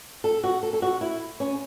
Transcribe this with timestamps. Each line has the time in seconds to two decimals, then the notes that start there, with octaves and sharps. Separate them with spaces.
0.24 A4
0.43 F#4
0.63 A4
0.73 A4
0.82 F#4
1.01 E4
1.40 C#4